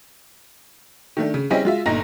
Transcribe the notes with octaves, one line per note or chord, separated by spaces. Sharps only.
D#3 A3 D4
C#3
G3 C4 C#4 E4 G#4 D#5
G#3 F4 E5
G1 A#2 D#4 A#5 A#6